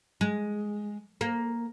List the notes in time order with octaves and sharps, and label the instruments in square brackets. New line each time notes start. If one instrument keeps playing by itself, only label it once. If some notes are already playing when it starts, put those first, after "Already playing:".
[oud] G#3
A#3